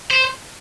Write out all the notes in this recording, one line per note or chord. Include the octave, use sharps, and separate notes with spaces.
C5